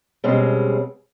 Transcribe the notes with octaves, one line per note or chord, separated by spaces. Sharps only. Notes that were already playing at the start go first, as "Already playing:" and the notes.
B2 G3 G#3 C4 C#4